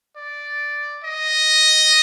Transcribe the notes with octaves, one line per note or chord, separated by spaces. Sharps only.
D5
D#5